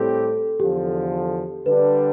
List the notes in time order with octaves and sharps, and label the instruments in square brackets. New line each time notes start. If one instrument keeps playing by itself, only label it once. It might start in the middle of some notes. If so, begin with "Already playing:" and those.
Already playing: [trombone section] A2 G3 C4 G4 [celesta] A4
[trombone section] E2 D3 F3 [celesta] G4
[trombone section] D3 G3 D4 [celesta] B4